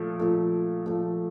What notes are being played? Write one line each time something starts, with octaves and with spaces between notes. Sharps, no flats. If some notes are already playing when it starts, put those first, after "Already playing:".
Already playing: A#2 F3 A3
A#2 F3 A3
A#2 F3 A3